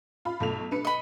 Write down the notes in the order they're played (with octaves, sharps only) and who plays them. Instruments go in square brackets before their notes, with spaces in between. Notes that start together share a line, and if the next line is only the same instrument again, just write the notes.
[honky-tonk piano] F4 B5
B1 A3 F7
D4 B4 C#7
[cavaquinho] D#5 B5